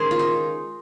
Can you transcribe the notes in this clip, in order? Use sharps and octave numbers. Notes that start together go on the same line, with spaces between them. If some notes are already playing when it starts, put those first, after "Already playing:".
Already playing: D#3 G#3 C#4 G#4 A#4 C5
F4
D#4